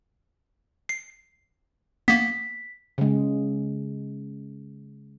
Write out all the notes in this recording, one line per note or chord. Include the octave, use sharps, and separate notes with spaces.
C7
A#3 B3 B6
C#3 G#3